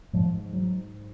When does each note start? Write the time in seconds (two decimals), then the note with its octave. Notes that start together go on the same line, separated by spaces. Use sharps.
0.13 G#2 F3
0.53 F#3